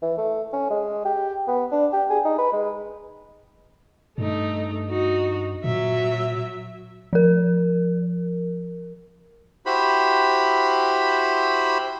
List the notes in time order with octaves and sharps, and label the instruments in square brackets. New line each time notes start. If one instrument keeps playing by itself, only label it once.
[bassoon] E3
A3
C#4
G#3
G4
B3
D4
G4
G#4
D#4
B4
G#3
[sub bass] G2 [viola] A3 D#4
[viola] D#4 F#4
[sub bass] A#2 [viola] F#3 E5
[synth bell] F3 A#4
[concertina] E4 F#4 G4 C5 B5